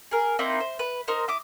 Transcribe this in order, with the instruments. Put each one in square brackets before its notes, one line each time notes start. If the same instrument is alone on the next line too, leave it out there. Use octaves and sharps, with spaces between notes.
[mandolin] G#4 A#4
A#3 C4 D#4 E4
C5
B4
D#4 A#4 C5
E4 D6 D#6